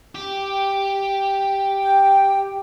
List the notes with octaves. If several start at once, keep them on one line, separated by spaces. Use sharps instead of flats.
G4
G5